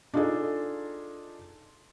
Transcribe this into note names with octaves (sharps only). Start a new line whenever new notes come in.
D4 D#4 F4 G#4 A4 D#5